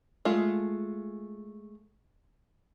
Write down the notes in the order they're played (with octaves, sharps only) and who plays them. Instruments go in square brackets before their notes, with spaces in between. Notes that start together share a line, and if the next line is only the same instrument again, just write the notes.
[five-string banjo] G#3 A3 F4